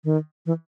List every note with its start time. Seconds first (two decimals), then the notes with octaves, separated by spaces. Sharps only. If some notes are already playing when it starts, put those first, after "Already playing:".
0.04 D#3
0.46 E3